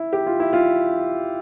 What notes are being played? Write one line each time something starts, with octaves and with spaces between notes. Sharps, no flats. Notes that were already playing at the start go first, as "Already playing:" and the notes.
Already playing: E4
G4
F4
E4
F4